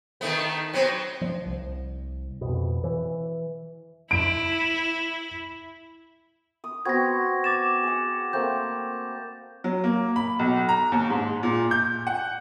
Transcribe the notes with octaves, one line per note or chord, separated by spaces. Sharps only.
D#3 A3 B3
F#3 B3 C4
F3
C2
F2 B2
E3
E4 D7
D#6
B3 C4 F#4 G#6 A#6
D6 A6 E7
G#4 F#5
A3 A#3 C4 G6
F#3
A#3
B5
B1
A#5
D#2
G#2
A#2
G6
F#5